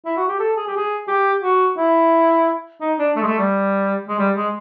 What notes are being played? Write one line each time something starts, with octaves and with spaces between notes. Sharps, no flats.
E4
F#4
G4
A4
G#4
G4
G#4
G4
F#4
E4
D#4
D4
A3
G#3
A3
G3
G#3
G3
G#3